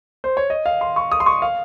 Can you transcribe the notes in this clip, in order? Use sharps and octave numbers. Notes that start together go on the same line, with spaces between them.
C5
C#5
D#5
F5
C6
C#6
D#6
C6
C#6
F5